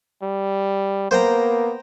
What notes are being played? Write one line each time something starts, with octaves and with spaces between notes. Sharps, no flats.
G3
A#3 B3 C5 G5 A#5